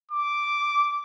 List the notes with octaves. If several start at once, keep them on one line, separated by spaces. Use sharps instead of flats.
D6